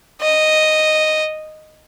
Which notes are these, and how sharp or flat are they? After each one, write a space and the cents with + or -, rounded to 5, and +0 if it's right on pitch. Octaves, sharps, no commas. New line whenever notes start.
D#5 -5